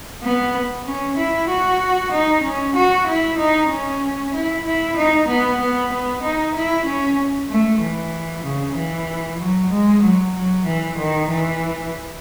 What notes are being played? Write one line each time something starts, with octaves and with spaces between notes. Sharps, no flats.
B3
C#4
E4
F#4
D#4
C#4
F#4
E4
D#4
C#4
E4
E4
D#4
B3
B3
B3
D#4
E4
C#4
A3
E3
C#3
E3
F#3
G#3
F#3
F#3
E3
D#3
E3